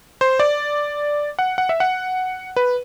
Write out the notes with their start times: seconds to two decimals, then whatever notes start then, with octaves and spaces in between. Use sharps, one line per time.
0.21 C5
0.40 D5
1.39 F#5
1.58 F#5
1.69 E5
1.80 F#5
2.56 B4